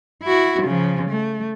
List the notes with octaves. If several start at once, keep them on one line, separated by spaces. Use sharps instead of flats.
E4 F#4
C#3 F3
A3